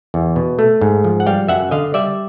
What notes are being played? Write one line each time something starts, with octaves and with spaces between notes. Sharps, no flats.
E2
B2
A3
G#2
F3
F#5
G3 F5 G5
F#2 E5 F#5
D3 D#5 F5
G3 D5 E5